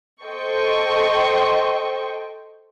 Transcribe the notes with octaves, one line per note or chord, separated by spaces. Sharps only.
A4 C5 D#5 G5 C#6